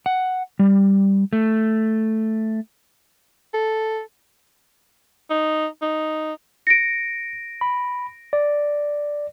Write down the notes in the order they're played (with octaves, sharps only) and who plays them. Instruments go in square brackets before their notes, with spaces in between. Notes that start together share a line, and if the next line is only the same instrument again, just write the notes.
[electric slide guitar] F#5
G3
A3
[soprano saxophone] A4
[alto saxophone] D#4
D#4
[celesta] A#6 D7 [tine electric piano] C#7
[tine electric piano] B5
D5